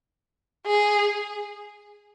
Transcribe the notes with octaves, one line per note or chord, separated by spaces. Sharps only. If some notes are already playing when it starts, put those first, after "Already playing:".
G#4